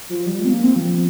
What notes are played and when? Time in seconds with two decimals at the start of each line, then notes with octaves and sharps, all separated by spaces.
0.09 F3
0.26 G3
0.39 G#3
0.45 C4
0.51 A#3
0.64 C4
0.76 F3